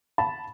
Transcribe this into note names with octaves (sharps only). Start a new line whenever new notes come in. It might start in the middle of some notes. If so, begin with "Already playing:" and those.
A5 B5